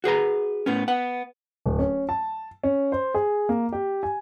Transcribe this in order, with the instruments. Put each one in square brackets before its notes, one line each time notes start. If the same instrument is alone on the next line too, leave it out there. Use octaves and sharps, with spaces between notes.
[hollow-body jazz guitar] F#4 G#4 B4 A#5
A2 B3 C#4
B3 F#5
[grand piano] D1
C#4
A5
C#4
C5
G#4
A#3
G4
G#5